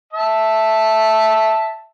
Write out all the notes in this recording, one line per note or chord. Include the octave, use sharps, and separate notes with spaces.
E5 A5